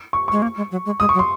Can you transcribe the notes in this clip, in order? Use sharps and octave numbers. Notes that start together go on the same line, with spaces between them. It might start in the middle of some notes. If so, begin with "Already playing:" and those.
C#6
G#3 C#6
A#3
G#3
F#3
G#3
G#3 D#6
C#6
F#3
C6